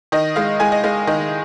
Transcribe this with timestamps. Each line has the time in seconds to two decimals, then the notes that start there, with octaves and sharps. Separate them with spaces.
0.12 D#3 D#5
0.36 G#3 F5
0.60 G#3 G#5
0.72 D#5
0.84 G#3 F5
1.07 D#3 D#5